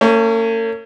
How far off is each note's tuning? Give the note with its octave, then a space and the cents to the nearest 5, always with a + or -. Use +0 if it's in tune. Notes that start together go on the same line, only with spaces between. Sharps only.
A#3 -45 C#4 +0